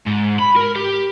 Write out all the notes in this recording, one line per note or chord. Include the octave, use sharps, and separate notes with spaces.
G#2
B5
A#4
G4